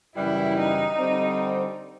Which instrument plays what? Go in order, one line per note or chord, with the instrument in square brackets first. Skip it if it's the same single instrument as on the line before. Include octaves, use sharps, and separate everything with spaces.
[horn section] F#2 C#3 E3 G3 [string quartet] E4
[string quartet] D#4
[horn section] D3 G3 C4